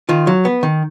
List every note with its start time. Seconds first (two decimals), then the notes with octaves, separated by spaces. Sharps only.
0.09 D#3 F4
0.27 F#3
0.45 B3
0.63 D#3